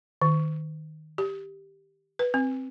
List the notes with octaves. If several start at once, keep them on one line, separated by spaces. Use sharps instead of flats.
D#3
G4
B4
C4